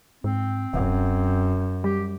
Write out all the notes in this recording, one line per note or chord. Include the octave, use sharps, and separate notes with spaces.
G#2 C4
D1 F#2
G3 G4